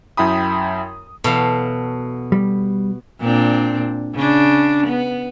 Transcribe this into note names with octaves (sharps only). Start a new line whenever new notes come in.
F#2 E4 G5 B5 D#6
E2 B2 F#3 A4 F5
G3
A#2 C4 D4
C#3 D4
B3